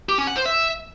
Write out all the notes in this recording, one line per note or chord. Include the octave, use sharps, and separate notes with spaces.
G4
C#4
F#5
C5
E5